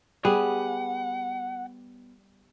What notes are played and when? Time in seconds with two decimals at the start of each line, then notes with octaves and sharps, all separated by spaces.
0.25 G3 B3 G#4 F#5